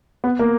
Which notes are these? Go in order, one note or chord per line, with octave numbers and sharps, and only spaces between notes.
B3
A#3